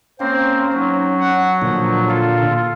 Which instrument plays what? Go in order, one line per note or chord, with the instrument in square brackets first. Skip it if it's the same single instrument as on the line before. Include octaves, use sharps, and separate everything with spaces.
[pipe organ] A#3 C4 [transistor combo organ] C#4 [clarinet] C5
[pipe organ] F#3 [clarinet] D#4
[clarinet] F#5
[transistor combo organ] A#2 D3 [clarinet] F3
[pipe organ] F4 A4 [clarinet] F5